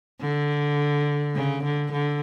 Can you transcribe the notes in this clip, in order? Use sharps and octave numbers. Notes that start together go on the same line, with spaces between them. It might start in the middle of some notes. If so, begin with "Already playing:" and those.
D3
C#3
D3
D3